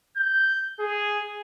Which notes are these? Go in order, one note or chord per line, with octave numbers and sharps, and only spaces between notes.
G6
G#4